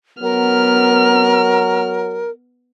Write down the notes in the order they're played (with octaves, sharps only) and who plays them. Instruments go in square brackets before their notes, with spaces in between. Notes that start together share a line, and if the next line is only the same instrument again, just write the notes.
[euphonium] F#3 [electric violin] B3 F6 [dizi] A#4